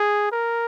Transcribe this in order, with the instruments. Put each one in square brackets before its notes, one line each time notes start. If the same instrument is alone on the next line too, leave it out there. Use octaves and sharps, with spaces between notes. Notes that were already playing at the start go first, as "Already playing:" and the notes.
Already playing: [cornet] G#4
A#4